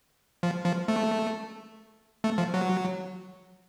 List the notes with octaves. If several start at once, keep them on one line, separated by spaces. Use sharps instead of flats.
F3
F3
A3
A3
F3
F#3